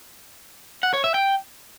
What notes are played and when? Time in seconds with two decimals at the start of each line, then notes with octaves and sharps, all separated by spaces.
0.83 F#5
0.93 C#5
1.04 E5
1.14 G5